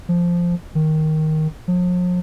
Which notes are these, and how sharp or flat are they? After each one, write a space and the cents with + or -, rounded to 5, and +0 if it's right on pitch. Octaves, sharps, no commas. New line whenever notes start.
F3 -5
D#3 +5
F3 +45